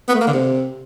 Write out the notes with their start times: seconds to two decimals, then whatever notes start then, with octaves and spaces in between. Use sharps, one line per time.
0.08 B3
0.15 A3
0.21 A#3
0.27 D3
0.33 C3